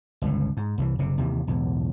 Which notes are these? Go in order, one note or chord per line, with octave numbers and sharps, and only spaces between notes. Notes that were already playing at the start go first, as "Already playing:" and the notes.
G1 C#2 A2
G#2
C2 D#3 E3
F#1 C3
D#2 C3 E3
B1 E2 A2